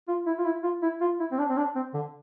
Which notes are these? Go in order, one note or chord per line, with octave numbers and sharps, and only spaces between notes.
F4
E4
F4
E4
F4
E4
F4
E4
C4
D4
C4
D4
C4
D3